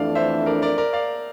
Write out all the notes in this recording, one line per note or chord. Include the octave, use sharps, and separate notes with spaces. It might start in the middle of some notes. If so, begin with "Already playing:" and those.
Already playing: F2 E3 A3 D4 D5 F5
C5 E5
A#4 D5
A#4 D5
A#4 D5
D5 F5